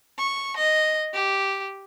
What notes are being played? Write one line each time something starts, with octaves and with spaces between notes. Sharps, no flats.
C#6
D#5
G4